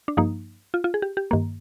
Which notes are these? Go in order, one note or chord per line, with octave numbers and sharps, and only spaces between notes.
D4
G2 F3 A#3 D#4
F4
F4
G#4
G4
G4
G2 D#3 A#3